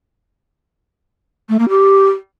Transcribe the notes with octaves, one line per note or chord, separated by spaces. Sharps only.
A3
A#3
G4